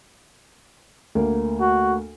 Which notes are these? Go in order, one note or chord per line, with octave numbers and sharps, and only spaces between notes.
D2 A#3
F#4